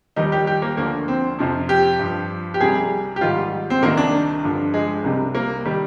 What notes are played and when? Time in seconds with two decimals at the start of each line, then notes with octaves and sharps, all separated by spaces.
0.16 D#2 D#3 G3 D#4
0.32 G4
0.47 G4
0.62 A#3
0.77 D2 D3 F3 A#3
1.08 C4
1.39 F2 C3 F3
1.69 G4
2.00 G2 F3
2.54 G4
2.61 C2 C3 G3 G#4
3.16 G4
3.21 G#2 D#3 G3 F4
3.70 C4
3.82 C2 C3 D#3 A#3
3.97 D4
4.43 G2 D3 F3
4.74 G#3
5.04 C2 C3 G3
5.35 A#3
5.65 D#3 G3